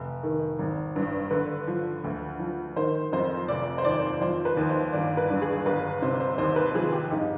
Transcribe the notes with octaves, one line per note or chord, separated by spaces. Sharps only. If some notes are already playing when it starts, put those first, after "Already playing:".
Already playing: F1
D#3
G#1
G2
D3 B4
F3
D2
F3
D#3 C5
F2 C5
F1 D5
C5
D#2 D5
F3 C5
B4
D#2
C5
G1 D5
B4
G2
G#4
G1 B4
C3 C5
C5
D#2 C5
B4
F3 G#4
G4
G1 D#4